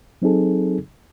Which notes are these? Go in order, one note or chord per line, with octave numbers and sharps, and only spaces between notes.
F#3 C4 D#4 G#4 A4